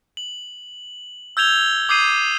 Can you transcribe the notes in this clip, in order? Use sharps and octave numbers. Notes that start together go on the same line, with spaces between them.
F#7
E6 G6 G#6 F7 G7
D6 D#6 G6 C7 D#7